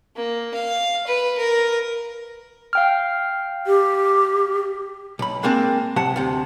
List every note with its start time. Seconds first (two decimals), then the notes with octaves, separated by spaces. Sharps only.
0.16 A#3
0.54 F5
1.07 B4
1.38 A#4
2.73 F5 G5 F6
3.67 G4
5.19 B1 B5
5.43 G#3 A#3 C4 D4
5.96 C3 F3 F#5 A5
6.16 D2 C3